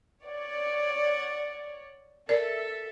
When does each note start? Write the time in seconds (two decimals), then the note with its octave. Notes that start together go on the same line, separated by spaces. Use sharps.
0.21 C#5 D5 F#5
2.29 A4 A#4 D5 E5